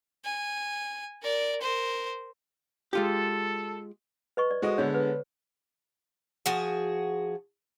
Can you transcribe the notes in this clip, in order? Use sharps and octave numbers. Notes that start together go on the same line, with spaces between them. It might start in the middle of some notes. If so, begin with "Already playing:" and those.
G#5
A#4 D5
A#4 C5
G#3 F4 G4 A4
B4 D#5 C#6
D5
G#3 F#4 A4 C5 D#5
D3 G#3 B3 C#5 D5
B4
F3 F#4 G#4